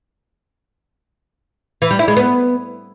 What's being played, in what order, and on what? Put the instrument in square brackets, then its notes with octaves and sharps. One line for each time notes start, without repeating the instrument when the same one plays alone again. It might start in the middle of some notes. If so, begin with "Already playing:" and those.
[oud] E3
G3
E4
G#3
B3